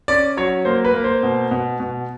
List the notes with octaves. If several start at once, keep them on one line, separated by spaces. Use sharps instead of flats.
C#4 D5
F#3 C#5
A#3 C5
B4
A#3
C5
B2
B2
B2